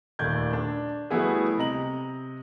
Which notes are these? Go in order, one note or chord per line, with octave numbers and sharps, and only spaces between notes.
D#1 D#2 A3 D5 G6 G#6
D4
F#3 G3 A3 B3 E4 G#4
C3 D#5 A#5 F#7